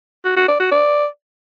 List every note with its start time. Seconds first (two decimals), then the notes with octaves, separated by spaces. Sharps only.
0.25 F#4
0.36 F#4
0.48 D5
0.60 F#4
0.72 D5